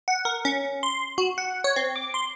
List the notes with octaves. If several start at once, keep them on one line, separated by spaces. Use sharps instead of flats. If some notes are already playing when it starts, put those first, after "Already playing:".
F#5
A#4
C#4
C6
F#4
F#5
C#5
C4
D6
C6